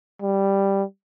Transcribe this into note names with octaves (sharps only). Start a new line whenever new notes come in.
G3